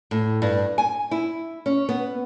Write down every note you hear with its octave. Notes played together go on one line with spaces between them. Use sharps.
A2
G2
G#5
E4
C#4
B3